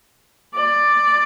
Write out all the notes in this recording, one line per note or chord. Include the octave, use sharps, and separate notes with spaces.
D5